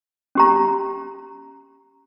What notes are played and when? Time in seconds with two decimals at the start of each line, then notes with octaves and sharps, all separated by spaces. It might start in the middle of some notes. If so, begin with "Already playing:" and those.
0.35 C#4 G4 A#5